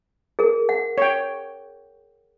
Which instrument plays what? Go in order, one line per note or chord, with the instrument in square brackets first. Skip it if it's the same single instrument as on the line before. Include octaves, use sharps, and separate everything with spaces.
[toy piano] G#4 A#4
F#5
[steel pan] C#5 G5